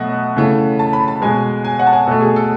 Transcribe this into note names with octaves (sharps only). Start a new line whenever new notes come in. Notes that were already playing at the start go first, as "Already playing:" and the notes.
Already playing: B2 F#3 A3 D#5 E5 F#5
C#3 E3 A3
A5
B5
A5
B2 G#3 G#5
G#5
F#5
A5
G#5
B2 A3 A4
G#4
A4